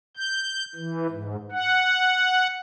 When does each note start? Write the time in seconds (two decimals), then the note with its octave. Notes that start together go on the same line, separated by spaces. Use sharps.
0.17 G6
0.75 E3
1.11 G#2
1.51 F#5